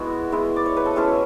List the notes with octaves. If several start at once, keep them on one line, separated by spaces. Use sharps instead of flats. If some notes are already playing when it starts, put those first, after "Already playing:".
Already playing: G#3 B3 E4 F#4
G#3 B3 E4
D5
C#5
B4
A4
G#3 C#4 E4 G#4